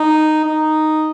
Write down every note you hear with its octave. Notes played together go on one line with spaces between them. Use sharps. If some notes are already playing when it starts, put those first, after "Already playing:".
Already playing: D#4
D#4